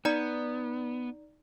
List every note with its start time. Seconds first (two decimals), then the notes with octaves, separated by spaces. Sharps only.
0.05 B3 D#4 D5 A#5